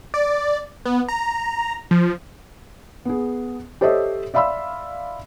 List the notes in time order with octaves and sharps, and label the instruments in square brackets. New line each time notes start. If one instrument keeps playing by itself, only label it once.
[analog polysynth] D5
B3
A#5
F3
[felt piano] B3 G#4
G4 A4 C5 C#5 D#5 E5
D5 E5 F5 B5 C6 E6